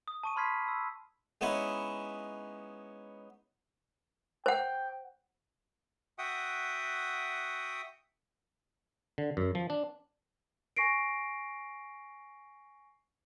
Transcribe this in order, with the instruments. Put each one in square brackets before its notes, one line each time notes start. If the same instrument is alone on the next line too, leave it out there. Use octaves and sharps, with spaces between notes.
[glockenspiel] D#6
A5 C#6 D#7
B5 C6 F6 G#6 B6 C7
B5 E6
[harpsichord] G#3 B3 C#4 D#4 E4
[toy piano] C5 F#5 [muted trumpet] G5
[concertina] F#4 E5 F#5 G5 D#6
[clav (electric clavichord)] D3
F#2
F3
D4
[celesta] G#5 C#6 A#6 C7 D7